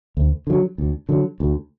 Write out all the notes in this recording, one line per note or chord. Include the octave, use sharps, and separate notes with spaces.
D2
D3 F#3
D2
D3 F#3
D2